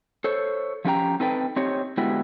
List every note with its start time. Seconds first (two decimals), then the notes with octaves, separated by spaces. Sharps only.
0.24 A4 C5 C#5
0.85 F3 A3 C#4 G4 G5 A#5
1.20 C4 D#4 A4 B4 G5
1.56 C4 D#4 G4 C#5
1.97 D3 G#3 B3 E4 F#4 G4